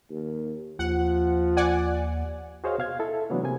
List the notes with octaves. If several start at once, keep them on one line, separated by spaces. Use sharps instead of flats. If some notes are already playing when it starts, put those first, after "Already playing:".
D#2
D#2 F3 F#5
D5 F#5 G#5
F#4 G#4 C5 C#5 D#5 F5
B2 F5 G#6
E4 A4 E5
C3 E3 F#3 A3 B3 D4
C3 A#3 G#5 G#6